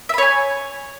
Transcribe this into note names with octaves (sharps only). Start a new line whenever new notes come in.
C#5 E5 G#5 B5